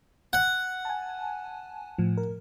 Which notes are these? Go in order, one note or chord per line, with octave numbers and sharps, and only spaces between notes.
F#5
G#5 A5
A2 F3
A#4